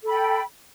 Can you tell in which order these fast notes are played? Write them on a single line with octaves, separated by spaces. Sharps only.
A4 B5 G5